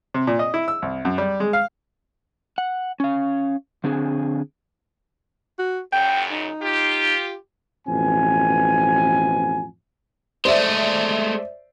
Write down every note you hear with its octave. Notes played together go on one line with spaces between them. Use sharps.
C3
A#2
D#5
E4
E6
C2
F#2
G3
G#3
F5
F#5
C#4 F5
D3 C4 D4 G#4
F#4
F#2 A#2 C#3 G5
D#4
F4 G4
A1 F2 B2 C4 G#5
G#3 A3 C5 D5 E5